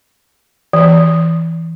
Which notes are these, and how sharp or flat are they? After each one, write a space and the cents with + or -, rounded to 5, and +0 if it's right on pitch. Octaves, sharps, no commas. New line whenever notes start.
E3 +0